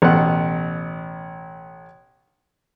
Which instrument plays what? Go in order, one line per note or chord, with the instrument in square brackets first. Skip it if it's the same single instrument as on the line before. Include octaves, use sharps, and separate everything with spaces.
[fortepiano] A1 B2 F#5